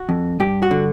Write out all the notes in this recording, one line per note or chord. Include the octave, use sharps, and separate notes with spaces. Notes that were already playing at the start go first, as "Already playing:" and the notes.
Already playing: F#4
F2
G2 G4
F#4
D3